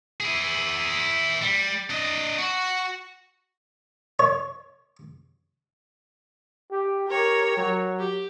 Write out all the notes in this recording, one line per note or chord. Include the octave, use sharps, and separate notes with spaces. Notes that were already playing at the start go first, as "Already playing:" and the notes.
E4 G#4
G3
D4 D#5
F#4
C#5
G4
G4 A#4 C#5
F#3
G4